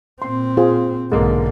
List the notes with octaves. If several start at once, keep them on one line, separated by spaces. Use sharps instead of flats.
A#2 C4 C6
F4 G#4 C5
B1 G#2 D3 G#3 A#3